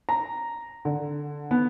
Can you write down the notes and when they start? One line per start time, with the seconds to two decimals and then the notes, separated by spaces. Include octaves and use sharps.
0.09 A#5
0.85 D3
1.51 B3